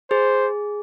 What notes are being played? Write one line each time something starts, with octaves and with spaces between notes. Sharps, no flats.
G#4 C5